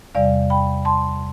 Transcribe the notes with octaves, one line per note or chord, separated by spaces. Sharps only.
E2 C3 G3 D5 F5
G5 B5
A5 C6